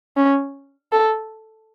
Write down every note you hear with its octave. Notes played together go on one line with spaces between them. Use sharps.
C#4
A4